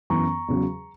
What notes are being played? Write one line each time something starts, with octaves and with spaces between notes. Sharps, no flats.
F#2 E3 B3 A#5 C#6
E2 C#3 F#3